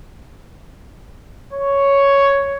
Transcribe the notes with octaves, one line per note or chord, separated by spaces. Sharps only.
C#5